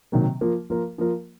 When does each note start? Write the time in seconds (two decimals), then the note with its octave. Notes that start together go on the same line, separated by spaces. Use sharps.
0.12 C3 D#3 F#3 A#3
0.41 F3 A#3 F4 A#4
0.70 F3 A#3 F4 A#4
0.98 F3 A#3 F4 A#4